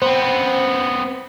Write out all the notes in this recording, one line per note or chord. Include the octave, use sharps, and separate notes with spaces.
B3 C4 C5